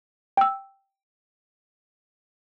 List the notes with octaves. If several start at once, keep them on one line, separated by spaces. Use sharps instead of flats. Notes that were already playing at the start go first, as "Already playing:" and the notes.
G5 E6